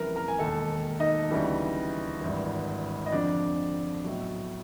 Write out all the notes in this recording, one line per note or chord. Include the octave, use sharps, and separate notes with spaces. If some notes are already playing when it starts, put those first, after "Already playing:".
Already playing: F2 C#3 E3 G3 A#4 B4 A#5
A#4 A#5
G#5
E1 D#2 D#3 A4 A5
D#4 D#5
D2 C#3 E3 G3
G#1 G2 E3
D#5
F2 D3 F3 D4 D5
B1 A2 F#3